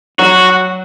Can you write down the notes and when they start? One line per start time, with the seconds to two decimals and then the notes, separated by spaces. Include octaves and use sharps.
0.19 F#3 F#4